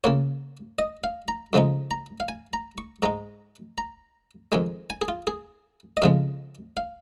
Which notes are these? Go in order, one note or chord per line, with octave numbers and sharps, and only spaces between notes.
C#3 A#3 F4 C#5
D#5
F5
A#5
F2 C#3 F3 G#3 D#4
A#5
F5
G#5
A#5
C#6
G#2 G#3 D#4 A#5
A#5
F2 D#3 G#3 G#5
G#5
G#4
F4
G#4
D#5
F2 C#3 F3 G#3 F5
F5